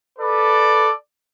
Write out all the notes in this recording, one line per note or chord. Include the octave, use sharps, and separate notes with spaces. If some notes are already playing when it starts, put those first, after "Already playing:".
A4 B4 D5